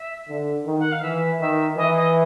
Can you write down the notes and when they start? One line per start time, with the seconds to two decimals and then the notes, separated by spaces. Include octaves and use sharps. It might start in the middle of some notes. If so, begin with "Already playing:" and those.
Already playing: E5
0.28 D3
0.66 D#3
0.80 F#5
0.92 F5
1.02 E3 E5
1.40 D#3 E5
1.77 E3 D#5
1.95 D#5